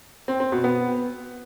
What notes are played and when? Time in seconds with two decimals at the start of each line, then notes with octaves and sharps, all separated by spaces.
0.28 C4
0.40 C4
0.52 B2
0.64 B3